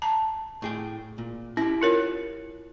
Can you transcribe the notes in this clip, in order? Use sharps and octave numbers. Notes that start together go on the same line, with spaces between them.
A5 A#5
A2 G#4 G5
A#2
C#4 E4 G4
F4 A#4 C#5